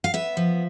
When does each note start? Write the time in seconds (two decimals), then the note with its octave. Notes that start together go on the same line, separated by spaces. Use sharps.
0.04 F5
0.14 B3 E5
0.37 F3